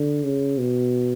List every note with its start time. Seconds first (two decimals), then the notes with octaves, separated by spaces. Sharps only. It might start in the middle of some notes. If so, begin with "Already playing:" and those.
Already playing: D3
0.24 C#3
0.59 B2